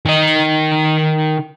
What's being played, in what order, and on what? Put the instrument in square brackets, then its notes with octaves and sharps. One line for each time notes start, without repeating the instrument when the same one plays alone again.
[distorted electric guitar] D#3 D#5